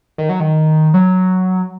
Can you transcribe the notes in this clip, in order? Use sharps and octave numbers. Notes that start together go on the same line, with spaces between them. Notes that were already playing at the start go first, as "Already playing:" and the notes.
D#3
F#3
D#3
F#3